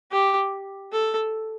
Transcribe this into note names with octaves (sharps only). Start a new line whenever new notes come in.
G4
A4